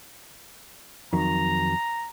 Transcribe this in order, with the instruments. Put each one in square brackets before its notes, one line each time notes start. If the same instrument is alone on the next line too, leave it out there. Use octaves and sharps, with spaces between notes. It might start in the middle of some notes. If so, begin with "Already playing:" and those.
[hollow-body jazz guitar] F2 D#3 F#3 [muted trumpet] A#5